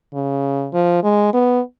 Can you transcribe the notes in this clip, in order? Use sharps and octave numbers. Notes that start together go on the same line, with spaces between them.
C#3
F3
G#3
B3